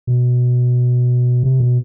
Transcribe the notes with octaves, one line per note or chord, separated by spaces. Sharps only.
B2
C3
B2